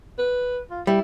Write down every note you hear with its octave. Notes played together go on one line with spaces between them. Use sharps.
B4
F4
G3 E4